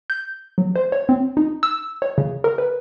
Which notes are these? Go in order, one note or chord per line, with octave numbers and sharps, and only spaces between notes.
G6
F#3
C5
C#5
C4
D#4
E6
C#5
C#3
A#4
B4